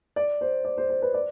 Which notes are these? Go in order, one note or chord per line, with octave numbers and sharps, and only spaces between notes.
D5
C5
D5
C5
C5
B4
D5